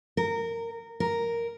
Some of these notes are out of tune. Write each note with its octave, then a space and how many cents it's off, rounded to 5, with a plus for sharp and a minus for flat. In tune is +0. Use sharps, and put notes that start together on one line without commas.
A#4 -20
A#4 +0